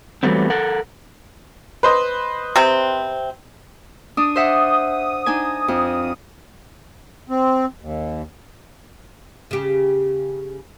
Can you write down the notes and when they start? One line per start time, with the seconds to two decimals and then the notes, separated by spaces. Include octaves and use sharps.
0.23 E3 F#3 G3 A3 B3 C4
0.50 A4 A#4 F#5
1.83 B4 C5 D#5
2.56 C3 C4
4.17 D4 D#6
4.36 C5 E5 F#5
5.26 D4 D#4 G#5
5.68 F2
7.30 C4
7.82 D#2
9.51 C#3 G4